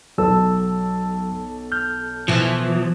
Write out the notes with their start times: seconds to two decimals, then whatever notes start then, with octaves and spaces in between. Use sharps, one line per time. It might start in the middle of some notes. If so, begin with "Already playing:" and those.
0.18 B1 F#3 A4 A5 E6
1.72 F6 G6
2.28 B2 E3 F3